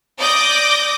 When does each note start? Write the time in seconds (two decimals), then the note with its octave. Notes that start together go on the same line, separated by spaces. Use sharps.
0.18 D5 D6 D#6 G6 A#6